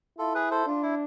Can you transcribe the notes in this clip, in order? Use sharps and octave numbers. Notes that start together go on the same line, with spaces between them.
E4 F4 A4
G#4 B4
A4 C5
D4 F4
E4